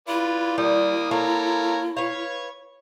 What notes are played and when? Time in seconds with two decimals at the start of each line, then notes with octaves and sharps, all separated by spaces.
0.08 E4 F4 B4 D5
0.58 G3 A#3 D#6
1.11 A#3 A4 A#4 C#5 F5
1.97 B4 C#5 F5 C#6